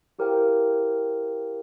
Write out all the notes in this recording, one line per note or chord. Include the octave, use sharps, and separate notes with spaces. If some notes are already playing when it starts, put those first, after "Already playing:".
E4 G4 A#4 C5 F5 G5